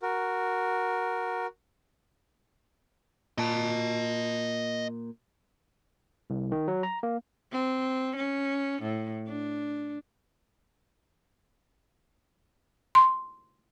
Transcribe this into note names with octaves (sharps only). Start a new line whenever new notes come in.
F#4 A#4
A#2 D#5 A5
C2
D#3
F#3
A#5
A#3
C4
C#4
A2
D4
C6